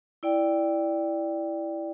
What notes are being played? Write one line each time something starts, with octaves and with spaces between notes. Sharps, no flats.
E4 D5 G5